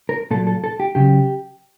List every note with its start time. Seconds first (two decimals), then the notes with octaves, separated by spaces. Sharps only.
0.09 A#4
0.31 A#2 A4
0.34 F#3
0.47 A4
0.64 A4
0.80 G4
0.95 C#3 F#3 G4